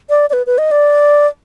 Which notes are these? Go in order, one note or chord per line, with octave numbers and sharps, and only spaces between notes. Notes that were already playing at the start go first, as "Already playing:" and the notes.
D5
D5
B4
B4
D#5
D5